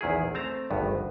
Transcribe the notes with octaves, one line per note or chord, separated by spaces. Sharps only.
A#1 E2 D#3 E4 G#4
A3 C4 A5 A#5
G#1 D2 G2 B3